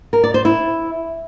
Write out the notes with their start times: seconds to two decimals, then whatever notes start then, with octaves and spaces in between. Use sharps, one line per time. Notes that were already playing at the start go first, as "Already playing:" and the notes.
0.13 A#4
0.24 D5
0.34 C5
0.45 E4